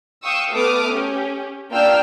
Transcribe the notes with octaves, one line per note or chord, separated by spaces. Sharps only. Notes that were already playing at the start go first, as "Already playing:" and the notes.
F5 G5 C#6 D#6 E6
A3 B3 B4 D6 D#6 F6
C#4 G4
A#3 D4 F4 G5 E6 F6